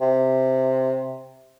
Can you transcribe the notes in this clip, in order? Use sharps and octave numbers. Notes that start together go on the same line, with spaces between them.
C3